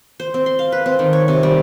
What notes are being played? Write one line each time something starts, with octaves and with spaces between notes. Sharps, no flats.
C5
C4
C6
F5
B4
C4
D#3
C#5
C3
G3